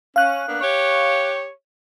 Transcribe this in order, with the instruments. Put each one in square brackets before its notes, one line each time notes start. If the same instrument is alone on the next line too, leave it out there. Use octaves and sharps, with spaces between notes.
[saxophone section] C#4 [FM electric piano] F5 F#6
[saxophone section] A#3 B3 D4
G4 C#5